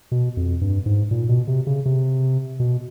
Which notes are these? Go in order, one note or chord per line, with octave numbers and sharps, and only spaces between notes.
B2
F2
G2
G#2
A#2
B2
C3
C#3
C3
B2